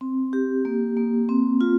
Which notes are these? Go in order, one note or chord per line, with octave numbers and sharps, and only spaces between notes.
C4
G4
A#3
A#3
C4
F4